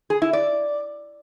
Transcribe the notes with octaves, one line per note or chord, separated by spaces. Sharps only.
G#4
E4
D5